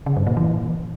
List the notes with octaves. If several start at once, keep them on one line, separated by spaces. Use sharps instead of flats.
C#3
G2
A#2
E3